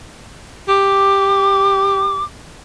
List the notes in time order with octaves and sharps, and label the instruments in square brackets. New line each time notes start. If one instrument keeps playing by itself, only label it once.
[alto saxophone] G4 [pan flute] D6